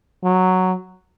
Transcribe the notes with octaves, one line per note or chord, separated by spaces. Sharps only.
F#3